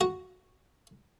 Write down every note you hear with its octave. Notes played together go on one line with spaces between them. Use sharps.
F#4